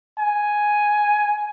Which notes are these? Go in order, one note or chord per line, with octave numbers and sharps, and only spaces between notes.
G#5